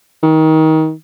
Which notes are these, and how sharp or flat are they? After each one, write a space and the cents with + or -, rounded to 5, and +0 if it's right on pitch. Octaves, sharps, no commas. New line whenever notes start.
D#3 +25